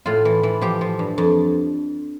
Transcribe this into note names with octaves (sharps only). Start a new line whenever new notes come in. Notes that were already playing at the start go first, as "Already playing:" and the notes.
A2 F4
E3
E3
F3 G4
F3
G2
F2